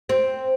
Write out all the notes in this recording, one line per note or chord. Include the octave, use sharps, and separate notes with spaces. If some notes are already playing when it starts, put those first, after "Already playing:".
C4